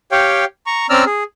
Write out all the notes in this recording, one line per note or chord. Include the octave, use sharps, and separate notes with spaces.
G4 C#5 F5 G5
A#5 C#6
C4 C#4 D5 A#5 E6 F6
G#4